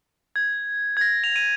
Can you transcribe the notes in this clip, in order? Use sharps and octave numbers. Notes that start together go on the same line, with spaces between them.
G#6
G#6
A#6
F7
D#7